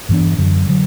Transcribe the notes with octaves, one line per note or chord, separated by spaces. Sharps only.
G2 E3 B3 D4
F#2 D3 F#3
D3 F#3